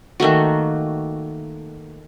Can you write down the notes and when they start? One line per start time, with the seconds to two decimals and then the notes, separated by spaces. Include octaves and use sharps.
0.20 D#3 A3 A#3 F#4